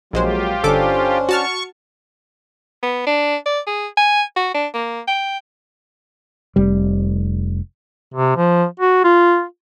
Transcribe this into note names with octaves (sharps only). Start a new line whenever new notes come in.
A#1 F#3 G#3 A#3 F4 G4 C5
G1 C#4 D4 A4 C5 D6
F#4 A5 C#6 F6
B3
D4
D5
G#4
G#5
F#4
D4
A#3
G5
F1 G3
C3
F3
F#4
F4